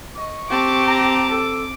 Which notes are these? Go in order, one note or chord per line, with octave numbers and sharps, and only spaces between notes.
D#5 C#6
C4 G4 A5 D6
A#5
A4